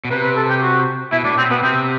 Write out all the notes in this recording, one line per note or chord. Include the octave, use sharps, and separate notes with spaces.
B2
C3 B4
B4
A4
G4
F#4
B2 E4
A2 D4
B2 C4
B2 B3
C3 C4